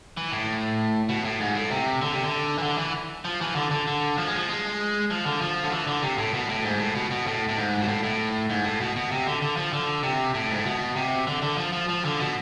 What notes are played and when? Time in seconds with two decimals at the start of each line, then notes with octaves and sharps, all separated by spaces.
0.17 E3
0.32 A2
1.09 B2
1.25 A2
1.40 G#2
1.55 A2
1.71 C3
2.02 D3
2.13 C3
2.23 D3
2.58 E3
2.63 D3
2.78 E3
3.25 F3
3.41 E3
3.56 D3
3.71 D3
3.87 D3
4.18 F3
4.27 G#3
4.35 F3
4.49 G#3
5.11 F3
5.26 D3
5.41 F3
5.63 D3
5.72 E3
5.87 D3
6.02 C3
6.18 A2
6.33 B2
6.49 A2
6.64 G#2
6.79 A2
6.95 B2
7.11 B2
7.27 A2
7.49 A2
7.57 G#2
7.81 B2
7.88 A2
8.04 A2
8.50 G#2
8.64 A2
8.81 B2
8.96 B2
9.12 C3
9.26 D3
9.42 D3
9.57 F3
9.73 D3
10.03 C3
10.34 A2
10.51 G#2
10.57 A2
10.66 B2
10.96 C3
11.27 D3
11.42 D3
11.58 F3
11.73 F3
11.89 F3
12.05 D3
12.20 B2